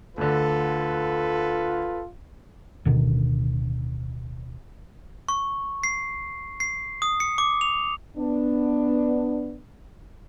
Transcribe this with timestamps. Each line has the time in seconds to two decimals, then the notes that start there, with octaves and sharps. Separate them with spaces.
0.18 D2 D3 F4 A4 B4
2.85 D1 B2 D3 D#3
5.28 C#6
5.84 C7
6.60 C7
7.02 D#6
7.20 C#7
7.38 D6
7.61 F7
8.17 B3 D4